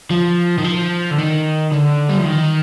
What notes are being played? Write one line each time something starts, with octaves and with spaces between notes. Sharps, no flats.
F3
D#3
F3
D3
D#3
D3
G3
F3
D#3